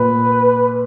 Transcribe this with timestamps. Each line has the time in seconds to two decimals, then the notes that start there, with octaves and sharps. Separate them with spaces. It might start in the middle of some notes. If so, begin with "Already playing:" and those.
Already playing: A#2 B4